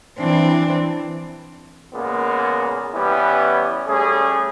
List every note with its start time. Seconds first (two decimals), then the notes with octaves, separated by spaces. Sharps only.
0.19 E3 C4 D4
1.94 A#2 C#3 G#3 A#3 B3
2.94 E3 G3 B3 C#4 E4
3.88 G3 A3 C#4 G#4